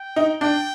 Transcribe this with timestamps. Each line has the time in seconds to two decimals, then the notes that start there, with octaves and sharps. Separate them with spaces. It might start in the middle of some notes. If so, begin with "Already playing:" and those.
Already playing: G5
0.16 D#4
0.41 D4 G5